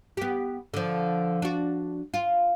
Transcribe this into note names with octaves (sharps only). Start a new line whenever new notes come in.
B3 G4
D3 F3
D4 F#4
F4